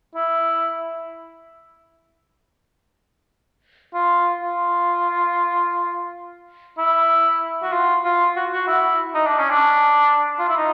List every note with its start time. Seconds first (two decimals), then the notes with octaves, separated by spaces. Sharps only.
0.15 E4
3.94 F4
4.41 F4
6.78 E4
7.63 F#4
7.73 F4
8.04 F4
8.36 F#4
8.53 F#4
8.67 E4
9.14 D#4
9.27 D4
9.39 C#4
9.50 D4
10.39 F4
10.48 E4
10.57 D#4